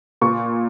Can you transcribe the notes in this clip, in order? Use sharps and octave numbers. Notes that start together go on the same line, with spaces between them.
A#2 C#6